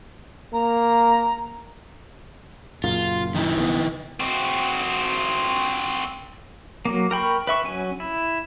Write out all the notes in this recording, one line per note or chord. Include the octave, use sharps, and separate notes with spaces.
A#3 A#5
F#2 A#2 C#3 F4
D#3 D#4 E4
B1 F3 B3
C4 F#4
F#3 A#3
A#4 G5 B5 C#6
B4 E5 C#6
F#3 C#4 G#5
E4